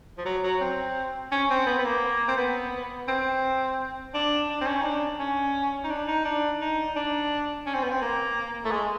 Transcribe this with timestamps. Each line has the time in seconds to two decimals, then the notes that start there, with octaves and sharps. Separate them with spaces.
0.18 F3
0.26 F#3
0.44 F#3
0.61 C4
1.32 C#4
1.50 C4
1.67 B3
1.79 B3
1.85 A#3
2.28 C4
2.37 B3
3.08 C4
4.14 D4
4.49 D4
4.61 C4
4.67 C#4
4.80 D#4
4.84 D4
5.19 C#4
5.84 D#4
5.90 D4
6.08 D#4
6.25 D4
6.61 D#4
6.96 D4
7.66 C#4
7.74 C4
7.83 B3
7.91 C4
8.02 A#3
8.65 A3
8.71 G#3